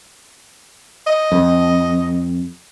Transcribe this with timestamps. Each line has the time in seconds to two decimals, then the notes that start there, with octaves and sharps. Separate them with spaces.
1.07 D#5
1.32 F2